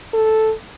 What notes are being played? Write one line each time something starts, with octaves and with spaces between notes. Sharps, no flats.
A4